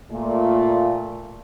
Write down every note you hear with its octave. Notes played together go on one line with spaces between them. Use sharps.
A#2 A3